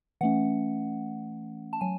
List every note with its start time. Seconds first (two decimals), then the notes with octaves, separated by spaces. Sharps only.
0.21 E3 A3 C#4 F#5
1.73 A5
1.81 F#3 G#5